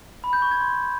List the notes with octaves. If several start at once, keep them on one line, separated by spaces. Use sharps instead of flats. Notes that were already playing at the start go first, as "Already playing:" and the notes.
B5
G6
C#6
G#6
C6